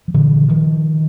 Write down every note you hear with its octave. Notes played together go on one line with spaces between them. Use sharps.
F3
A#2 D3 E3
D#3 F3